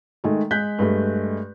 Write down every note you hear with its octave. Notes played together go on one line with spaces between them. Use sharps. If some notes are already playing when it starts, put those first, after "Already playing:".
D#3 G#3 A3
G#3 F#6 G6 B6
G2 G#3 A3